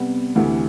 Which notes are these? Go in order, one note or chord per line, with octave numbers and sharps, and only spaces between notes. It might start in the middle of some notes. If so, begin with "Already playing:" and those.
Already playing: C3 G3 B3
D2 C3 E3 A3 E4